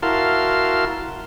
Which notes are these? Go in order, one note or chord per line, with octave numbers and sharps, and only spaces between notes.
E4 F#4 A#4 F5 A5 C6